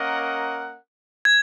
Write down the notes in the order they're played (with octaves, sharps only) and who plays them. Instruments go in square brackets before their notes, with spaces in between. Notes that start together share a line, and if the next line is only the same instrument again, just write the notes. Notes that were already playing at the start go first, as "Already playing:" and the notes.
Already playing: [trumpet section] A#3 C#4 A#4 D#5 F#5
[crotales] G#6